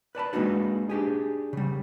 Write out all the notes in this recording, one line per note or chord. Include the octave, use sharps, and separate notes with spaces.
B4 D5 A5 B5
G#3 A#3 D4 D#4 F#4 B4
D4 G4 G#4
C#3 G3